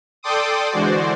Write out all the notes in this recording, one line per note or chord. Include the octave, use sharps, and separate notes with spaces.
A4 D5 G5 C6 D6 D#6
D3 E3 G#3 F#4 C5 D5